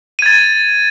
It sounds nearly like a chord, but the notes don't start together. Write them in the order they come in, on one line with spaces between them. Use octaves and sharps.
D#7 G#6 A6